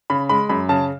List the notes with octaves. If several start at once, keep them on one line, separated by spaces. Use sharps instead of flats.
C#3 B5
G#3 B5
F#2 B5
C#3 A5